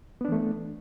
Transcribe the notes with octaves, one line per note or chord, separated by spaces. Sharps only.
E3 A3 B3 D4